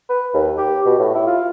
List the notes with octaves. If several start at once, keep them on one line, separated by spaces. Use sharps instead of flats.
B4
D#2
G4
B2
A2
E4
F4